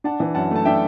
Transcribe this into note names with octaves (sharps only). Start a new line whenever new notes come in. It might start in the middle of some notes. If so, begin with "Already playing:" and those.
D4 F#5 A5
E3
F#2 F#5 A5
A3 A5
D4 E5 G5